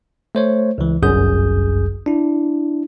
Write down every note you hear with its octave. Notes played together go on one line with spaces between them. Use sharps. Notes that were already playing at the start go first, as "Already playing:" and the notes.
A3 C5 C#5
C#2 E3
G1 C2 F#2 G#4 D#6 G6
D4 E4